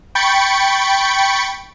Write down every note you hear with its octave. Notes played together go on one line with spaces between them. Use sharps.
G5 B5 C#6 G6 A6 C#7